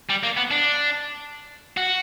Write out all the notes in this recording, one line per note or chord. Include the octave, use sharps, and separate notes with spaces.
G3
A#3
B3
D4
F#4